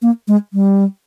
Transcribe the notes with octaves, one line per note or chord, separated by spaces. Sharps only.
A#3
G#3
G3